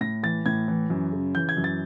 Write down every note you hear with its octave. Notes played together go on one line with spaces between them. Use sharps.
A2 A#6
E3 A6
A2 G#6
E3
F#2
C#3
E3 G6
G#6
F#2
A6